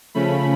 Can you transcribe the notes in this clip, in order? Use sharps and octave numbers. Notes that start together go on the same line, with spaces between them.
C#3 F3 A3 C#4 B5